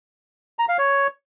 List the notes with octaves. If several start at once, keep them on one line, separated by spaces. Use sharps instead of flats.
A#5
F5
C#5